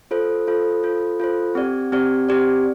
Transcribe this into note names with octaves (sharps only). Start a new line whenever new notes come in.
F4 A4 C5
F4 A4 C5
F4 A4 C5
F4 A4 C5
C4 G4 D5
C4 G4 D5
C4 G4 D5